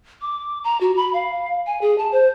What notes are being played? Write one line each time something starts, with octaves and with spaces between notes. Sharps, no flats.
D6
A#5
F#4
B5
F5
G#5
G#4
A5
C5